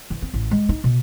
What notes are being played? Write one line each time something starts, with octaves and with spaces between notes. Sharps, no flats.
E3
C4
A1
G#3
D#4
B2